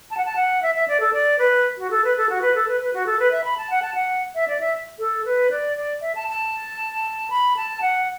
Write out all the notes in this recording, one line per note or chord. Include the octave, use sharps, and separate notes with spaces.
A5
F#5
A5
F#5
E5
E5
D5
A4
D5
B4
F#4
A4
B4
A4
F#4
B4
A4
B4
B4
F#4
A4
B4
E5
B5
A5
F#5
A5
F#5
E5
D5
E5
A4
B4
D5
D5
E5
A5
A5
B5
A5
F#5